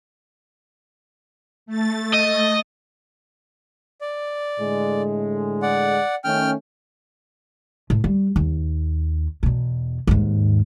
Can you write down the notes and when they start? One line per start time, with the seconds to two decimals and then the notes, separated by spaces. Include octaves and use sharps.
1.66 A3 A6
2.14 D#5
4.01 D5
4.59 A2 D3 G#3
5.62 D5 F#5
6.24 D#3 A3 C#4 G5 F6
7.90 A2
8.04 G3
8.36 D#2
9.43 E2 B2
10.07 D#2 G#2